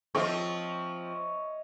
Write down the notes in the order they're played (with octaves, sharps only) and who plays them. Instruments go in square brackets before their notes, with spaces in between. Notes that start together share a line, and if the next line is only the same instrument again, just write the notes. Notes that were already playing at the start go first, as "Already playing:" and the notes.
[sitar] F3 C4 [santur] C#5 D#5 E5